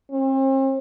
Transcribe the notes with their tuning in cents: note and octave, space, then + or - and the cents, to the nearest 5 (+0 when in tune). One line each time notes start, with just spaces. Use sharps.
C4 +40